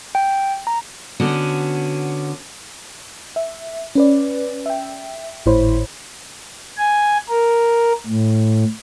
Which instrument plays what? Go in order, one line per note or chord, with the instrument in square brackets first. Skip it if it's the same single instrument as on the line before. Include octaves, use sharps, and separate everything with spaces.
[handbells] G5
A#5
[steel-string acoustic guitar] D3 B3 C#4 F#4
[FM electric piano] E5
C#4 B4 D5
E5 G5
G#1 A2 E4 C5 C#5 B5
[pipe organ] G#5
A#4
A2